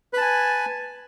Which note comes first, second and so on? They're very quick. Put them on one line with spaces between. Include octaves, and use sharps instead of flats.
B4 A5 G#5